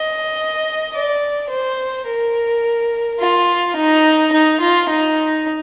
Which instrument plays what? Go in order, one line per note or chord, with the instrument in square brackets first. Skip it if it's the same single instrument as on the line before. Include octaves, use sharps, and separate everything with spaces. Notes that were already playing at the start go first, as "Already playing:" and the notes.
Already playing: [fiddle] D#5
D5
C5
A#4
F4
D#4
D#4
F4
D#4